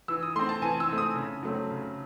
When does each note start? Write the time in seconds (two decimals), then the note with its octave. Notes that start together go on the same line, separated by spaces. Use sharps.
0.08 E3 E6
0.23 D#6
0.35 A3 C4 C6
0.49 A5
0.62 E3 G#5
0.80 E6
0.89 A3 C4
0.98 D#6
1.15 C#3
1.43 F#3 A3 C4
1.70 C#3